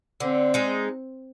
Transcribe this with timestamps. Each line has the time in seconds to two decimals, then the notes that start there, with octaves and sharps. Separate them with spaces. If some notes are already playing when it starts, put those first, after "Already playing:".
0.20 D3 C4
0.54 G#3 D#4